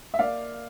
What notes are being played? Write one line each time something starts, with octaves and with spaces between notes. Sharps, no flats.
E5
A#3 D5 F5